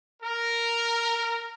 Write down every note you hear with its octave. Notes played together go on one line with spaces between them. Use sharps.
A#4